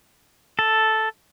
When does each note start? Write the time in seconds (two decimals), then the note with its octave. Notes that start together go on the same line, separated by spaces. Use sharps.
0.59 A4